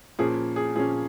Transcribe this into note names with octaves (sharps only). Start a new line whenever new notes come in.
A#2 F3 A#3 C#4 G#4
G#4
A#2 F3 A#3 C#4 G#4